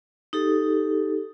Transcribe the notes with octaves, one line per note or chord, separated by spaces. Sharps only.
D#4 G4 A4